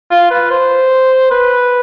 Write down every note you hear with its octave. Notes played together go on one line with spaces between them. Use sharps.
F4
B4
C5
B4